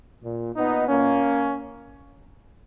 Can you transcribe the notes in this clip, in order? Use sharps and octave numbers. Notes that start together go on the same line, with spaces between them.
A#2
A#2 B3 D#4
A#2 A#3 C#4